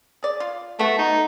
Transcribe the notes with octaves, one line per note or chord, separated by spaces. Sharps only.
G#4 D5
F4
A3 B3 F#4
D#4